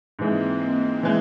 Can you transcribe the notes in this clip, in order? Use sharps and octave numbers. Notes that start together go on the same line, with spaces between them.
G#2 E3 G#3 A#3 C4
E3 G#3